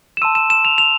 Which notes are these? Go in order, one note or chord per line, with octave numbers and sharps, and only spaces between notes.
E7
A5 C6 E6 D#7
E7
E7
F7
F7